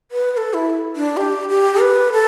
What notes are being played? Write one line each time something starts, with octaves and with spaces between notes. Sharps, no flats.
B4
B4
A4
E4
D4
G4
G4
B4
A4